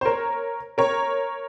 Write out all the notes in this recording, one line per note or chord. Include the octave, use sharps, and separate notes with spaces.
C5
A#4 C#5
A#4 C#5